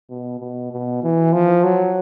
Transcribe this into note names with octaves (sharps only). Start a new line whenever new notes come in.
B2
B2
B2
E3
F3
F#3